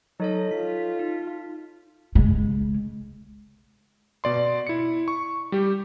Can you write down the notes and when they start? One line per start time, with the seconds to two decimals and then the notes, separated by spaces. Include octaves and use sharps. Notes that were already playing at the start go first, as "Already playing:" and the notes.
0.20 F#3 D#4 A4 C#5 D#5
0.51 F4 B6
0.99 D#4
2.15 C#3 G#3
4.24 B2 D5 C6
4.67 E4 C#7
5.08 C#6
5.52 G3 G4